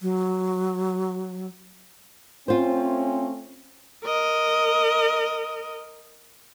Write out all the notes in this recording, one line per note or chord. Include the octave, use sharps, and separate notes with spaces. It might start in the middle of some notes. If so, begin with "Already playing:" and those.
F#3
A3 C4 C#4 F4 C5
A#4 D#5